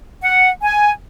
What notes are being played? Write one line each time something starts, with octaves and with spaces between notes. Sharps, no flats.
F#5
G#5